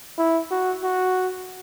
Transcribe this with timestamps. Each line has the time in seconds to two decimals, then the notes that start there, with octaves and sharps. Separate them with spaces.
0.18 E4
0.51 F#4
0.84 F#4